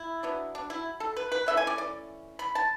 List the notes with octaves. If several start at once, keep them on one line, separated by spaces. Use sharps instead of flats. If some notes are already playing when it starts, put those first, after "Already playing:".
Already playing: E4
F#3 B3 D4
D4
E4
A4
B4
B4
E3 A3 C#4 E5
G#5
D5
D5
B5
A5